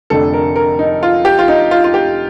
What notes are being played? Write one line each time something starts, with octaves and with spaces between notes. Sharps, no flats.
F1 F2 D3 A3 D4 A4
A#4
A#4
D#4
F4
G4
F4
D#4
F4
F4
G4